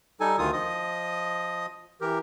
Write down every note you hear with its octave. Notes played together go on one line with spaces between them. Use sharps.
G3 D#4 A4 G#5
D2 D#3 F4 D#6
F3 D#5 D#6
E3 G4 A#4